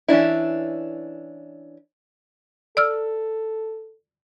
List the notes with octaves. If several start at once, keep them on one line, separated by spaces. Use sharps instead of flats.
E3 C#4 D4 E4
A4 D5 E6 F6